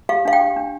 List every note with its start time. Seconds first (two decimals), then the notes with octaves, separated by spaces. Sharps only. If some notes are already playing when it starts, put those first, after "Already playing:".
0.09 G4 F5
0.25 D4 F5
0.33 G5
0.41 G4
0.56 D4